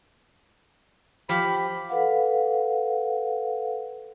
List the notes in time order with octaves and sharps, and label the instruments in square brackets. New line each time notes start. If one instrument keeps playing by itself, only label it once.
[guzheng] F3 G4 [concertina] B5
[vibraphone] A4 B4 F5 F#5